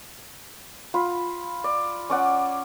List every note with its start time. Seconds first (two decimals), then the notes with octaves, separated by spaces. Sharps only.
0.94 F4 B5
1.64 D5
2.10 C#4 D5 F#5